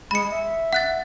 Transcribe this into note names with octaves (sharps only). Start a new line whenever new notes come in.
G#3 B5 C#7
E5
F#5 F#6 A6